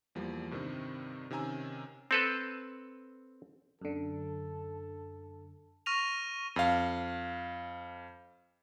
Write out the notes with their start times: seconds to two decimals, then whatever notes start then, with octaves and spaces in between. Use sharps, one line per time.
0.15 E2 F3 G3 A#3
0.51 G2 C3 D#3 G3 C4 D#4
1.30 C3 D#3 C#4 G#5 A#5 E6
2.11 C4 A4 B4
3.81 F#2 D3 A4
5.86 C#6 F6 A#6 D#7 F7
6.56 F2 F5